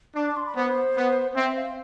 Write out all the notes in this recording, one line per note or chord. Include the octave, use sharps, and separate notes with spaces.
D4 D6
D6
C6
B5
B3 C5
B3
C4 E5
F5